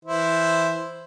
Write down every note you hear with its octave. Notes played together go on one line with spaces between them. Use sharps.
E3 E4 C5